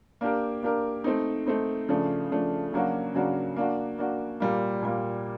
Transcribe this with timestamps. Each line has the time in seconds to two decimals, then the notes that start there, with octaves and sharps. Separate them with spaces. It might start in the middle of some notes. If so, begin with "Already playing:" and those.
0.21 A#3 D4 G4 A#4
0.63 A#3 D4 G4 A#4
1.04 A3 C4 D#4
1.47 A3 C4 D#4
1.89 C#3 F3 A3 D4
2.31 C#3 F3 A3 D4
2.73 C#3 F#3 A#3 D4 F#4
3.14 C#3 F#3 A#3 D4 F#4
3.56 A#3 D4 F#4
3.99 A#3 D4 F#4
4.40 A#2 G3 A#3
4.83 A#2 G3 A#3